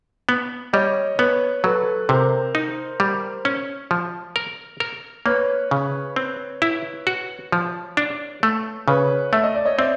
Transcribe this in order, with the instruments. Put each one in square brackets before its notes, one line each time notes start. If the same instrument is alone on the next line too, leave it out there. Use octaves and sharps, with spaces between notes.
[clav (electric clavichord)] B3
[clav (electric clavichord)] G3 [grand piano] C#5 D#5
[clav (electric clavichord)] B3 [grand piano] B4 C#5
[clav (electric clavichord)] F#3 [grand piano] A4 B4
[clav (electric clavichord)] C3 [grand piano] A#4 C5
[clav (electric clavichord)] D#4
G3
C#4
F3
A#4
A#4
[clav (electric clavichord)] A#3 [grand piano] B4 C#5
[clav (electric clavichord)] C#3
C4
E4
F#4
F3
D4
A3
[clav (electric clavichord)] C#3 [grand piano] B4 C#5
[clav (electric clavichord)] A3 [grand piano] E5
[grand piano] D#5
D5
C#5 D#5
[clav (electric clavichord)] C4 [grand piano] D5 E5